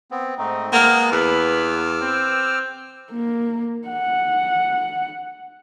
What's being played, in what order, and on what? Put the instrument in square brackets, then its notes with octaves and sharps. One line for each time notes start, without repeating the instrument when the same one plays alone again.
[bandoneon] B3 C4
[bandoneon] G#2 A3 C4 [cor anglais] D#4
[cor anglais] G#3 [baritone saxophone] A#3 [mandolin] B3 F5
[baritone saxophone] E2 [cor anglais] B4 [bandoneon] D6 E6 F6
[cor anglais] C4
[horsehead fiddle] A#3
F#5